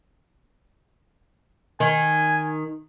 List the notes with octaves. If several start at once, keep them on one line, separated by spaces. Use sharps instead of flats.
D#3 G#5